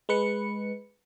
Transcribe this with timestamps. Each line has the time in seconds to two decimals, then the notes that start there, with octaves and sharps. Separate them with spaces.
0.09 G#3 B4 C#7